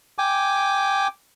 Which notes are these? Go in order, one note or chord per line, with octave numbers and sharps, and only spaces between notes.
G5 G#5 D6